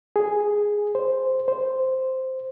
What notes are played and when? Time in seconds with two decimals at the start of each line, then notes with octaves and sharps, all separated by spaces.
0.16 G#4
0.95 C5
1.48 C5